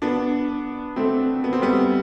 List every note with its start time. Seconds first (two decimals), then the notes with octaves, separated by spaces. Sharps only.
0.02 B3 D4
0.96 A3 C4
1.44 B3
1.53 C4
1.62 G3 B3